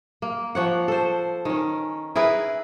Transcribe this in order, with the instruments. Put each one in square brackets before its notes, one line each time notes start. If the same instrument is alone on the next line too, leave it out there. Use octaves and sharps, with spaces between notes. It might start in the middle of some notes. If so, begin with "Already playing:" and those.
[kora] A#3
F3 C#5 F#5
A4 C5
D#3 C#4
E4 G#4 A#4 B4